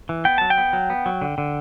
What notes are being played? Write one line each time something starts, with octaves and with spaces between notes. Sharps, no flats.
E3
B3 G5
F#3 A5
G5
B3
F#3
B3
F#3
D3
D3